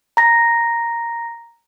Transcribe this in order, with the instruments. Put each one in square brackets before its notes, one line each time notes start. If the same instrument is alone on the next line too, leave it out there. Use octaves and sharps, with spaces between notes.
[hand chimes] A#5 A#6